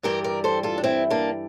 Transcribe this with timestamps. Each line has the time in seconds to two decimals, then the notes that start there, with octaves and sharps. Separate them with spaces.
0.03 G2 E3 G3 G4 A#4
0.24 A#4 D5
0.44 A4 C5
0.63 F4 A4
0.78 D4
0.84 C4 E4
1.10 A#3 D4